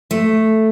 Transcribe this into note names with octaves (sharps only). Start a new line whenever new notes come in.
A3